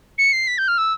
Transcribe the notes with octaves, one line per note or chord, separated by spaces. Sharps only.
C#7
C7
B6
G6
F6
E6